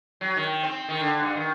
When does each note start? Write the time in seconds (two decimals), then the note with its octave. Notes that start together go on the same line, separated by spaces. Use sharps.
0.21 F#3
0.36 D#3
0.63 C4
0.88 D#3
1.01 D3
1.20 G2
1.36 D#3